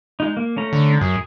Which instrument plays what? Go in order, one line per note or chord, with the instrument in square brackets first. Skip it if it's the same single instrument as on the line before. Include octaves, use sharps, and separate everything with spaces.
[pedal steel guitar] G#3 D#4
A#3
A3 C#4 A#5
[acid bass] D3
[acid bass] F#2 [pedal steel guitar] G#4